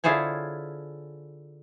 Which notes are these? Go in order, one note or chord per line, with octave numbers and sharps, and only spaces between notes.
D3 E4 F4 G#4 C5 C#5